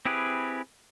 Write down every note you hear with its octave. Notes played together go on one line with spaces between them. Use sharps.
C4 E4 G4 G#4 B4